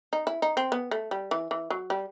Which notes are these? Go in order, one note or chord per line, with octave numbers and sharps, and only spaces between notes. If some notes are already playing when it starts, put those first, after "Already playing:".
D#4
E4
D#4
C4
B3
A3
G3
E3
E3
F#3
G3